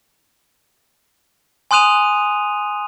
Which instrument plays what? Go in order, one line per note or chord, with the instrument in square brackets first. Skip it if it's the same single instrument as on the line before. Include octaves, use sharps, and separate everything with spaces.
[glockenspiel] G#5 C6 D#6 F#6 D#7 F7